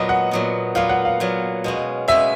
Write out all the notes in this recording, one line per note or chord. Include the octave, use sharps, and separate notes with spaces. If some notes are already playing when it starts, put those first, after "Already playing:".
Already playing: A#2 F#3 B3 D#5
F#5
A#2 F#3 B3
A#2 F#3 B3 F5
F#5
F5
A#2 F#3 B3
B2 G#3 C#4
B2 G#3 C#4 E5